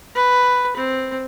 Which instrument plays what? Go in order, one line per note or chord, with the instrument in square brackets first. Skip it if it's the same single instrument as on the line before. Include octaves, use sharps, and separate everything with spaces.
[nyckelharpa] B4
C4